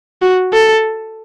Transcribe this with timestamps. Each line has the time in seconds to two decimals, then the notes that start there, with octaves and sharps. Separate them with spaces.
0.22 F#4
0.53 A4